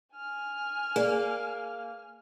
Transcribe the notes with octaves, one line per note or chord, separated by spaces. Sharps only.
G#5 F6
A#3 G#4 D5